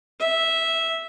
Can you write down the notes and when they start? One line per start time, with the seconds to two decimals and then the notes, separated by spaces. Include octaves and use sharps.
0.20 E5